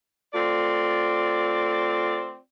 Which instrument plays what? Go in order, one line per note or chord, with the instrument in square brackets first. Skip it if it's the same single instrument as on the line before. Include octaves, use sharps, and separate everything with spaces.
[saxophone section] A3 C4 F4 D5